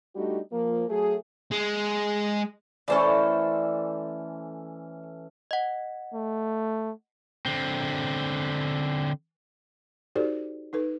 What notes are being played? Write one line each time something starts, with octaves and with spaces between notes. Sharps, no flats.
G3 A3 D4 D#4 F#4 G4
F3 A#3
F#3 A3 G#4
G#3
E3 A3 C#4 A4 C5 D5
D#5 F#5
A3
D3 C4
D#4 F#4 G4 A4 C5 D5
D#4 A4 B4